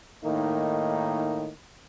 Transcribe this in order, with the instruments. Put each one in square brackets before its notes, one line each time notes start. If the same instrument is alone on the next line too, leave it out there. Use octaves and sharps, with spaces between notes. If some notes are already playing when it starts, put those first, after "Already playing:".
[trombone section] A2 D#3 A#3 D#4